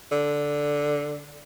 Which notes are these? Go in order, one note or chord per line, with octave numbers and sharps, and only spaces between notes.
D3